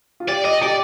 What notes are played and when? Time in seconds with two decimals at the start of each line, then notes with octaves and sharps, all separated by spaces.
0.20 F4
0.28 G4 D5
0.45 D#5
0.62 G4 D5